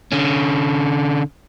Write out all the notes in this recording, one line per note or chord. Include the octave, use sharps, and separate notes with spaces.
D3 C#4